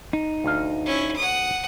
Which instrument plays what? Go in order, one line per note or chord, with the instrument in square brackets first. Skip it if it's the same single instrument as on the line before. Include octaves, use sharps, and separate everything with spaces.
[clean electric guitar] D#4
[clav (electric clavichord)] D2 F5
[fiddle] C#4 E4
F#5 D#6